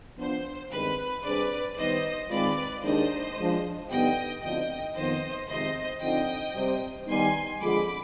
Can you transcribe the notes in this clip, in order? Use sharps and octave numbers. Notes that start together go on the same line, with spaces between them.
F3 B3 D4 C5
G2 D#3 G#3 C4 B4
C3 G3 D4 G#4 B4 C5 D5
D#3 G3 B3 D#4 B4 C5 D#5
D#3 G#3 C4 F4 B4 D5
D#2 D#3 G#3 D4 C5 D#5
F3 G#3 D4
G2 D3 G3 B3 D#4 D#5 G5
D2 D3 F3 C4 D#4 D#5 G5
F2 D#3 B3 C5 D#5
F2 C3 D#3 G#3 C4 C5 D#5
F2 D3 F3 C4 D#4 D#5 G5
C3 G3 C4 G4 C5
D#3 G3 B3 D#4 G#5 C6
F2 D3 F3 G#3 B5 D6